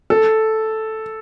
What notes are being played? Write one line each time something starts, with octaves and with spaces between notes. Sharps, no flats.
A4